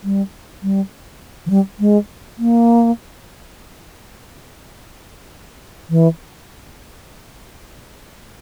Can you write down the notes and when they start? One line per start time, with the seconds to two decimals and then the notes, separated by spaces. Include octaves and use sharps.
0.04 G3
0.63 G3
1.46 E3
1.50 G3
1.80 G#3
2.38 A#3
5.90 E3